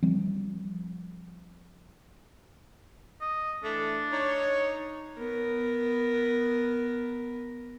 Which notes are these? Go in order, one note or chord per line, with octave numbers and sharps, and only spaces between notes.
F3 G3 C4
D#5
E3 A3 D4
D#4 C#5
B3 A#4